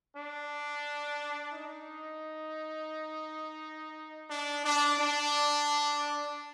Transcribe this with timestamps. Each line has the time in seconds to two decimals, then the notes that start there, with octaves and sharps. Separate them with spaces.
0.14 D4
1.52 D#4
4.29 D4
4.64 D4
4.98 D4